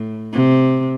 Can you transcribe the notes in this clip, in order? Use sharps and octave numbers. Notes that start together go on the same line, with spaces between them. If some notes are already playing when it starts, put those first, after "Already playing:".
Already playing: A2
C3